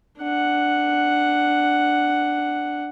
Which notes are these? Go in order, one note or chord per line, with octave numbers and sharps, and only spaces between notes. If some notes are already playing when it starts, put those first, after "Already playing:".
D4 F#5